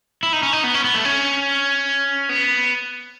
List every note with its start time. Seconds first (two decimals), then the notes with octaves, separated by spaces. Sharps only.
0.23 E4
0.33 D#4
0.43 C#4
0.53 D#4
0.64 B3
0.74 C#4
0.84 B3
0.95 A3
1.05 C#4
2.29 B3